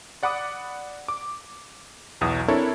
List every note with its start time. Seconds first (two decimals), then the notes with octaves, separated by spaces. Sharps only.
0.23 D5 F#5 B5 D6 D#6
1.08 D6
2.21 B1 E2 D#6
2.48 C4 D4 E4 A4 A#4 C#5